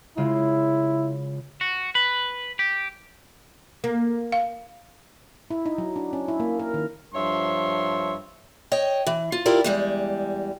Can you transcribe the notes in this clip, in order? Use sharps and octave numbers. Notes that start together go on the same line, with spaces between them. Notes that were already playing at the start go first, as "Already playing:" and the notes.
C#3 G#3 E4 F4
F#4
B4
G4
A#3
F5
E4
D#4
F#3
D4
C#4
E4
A#3
A#4
D#3
G2 F3 C#5 E5 C6
C#5 D#5 G5
E3
F4
E4 F4 G4 A#4 D5
E2 G3 G#3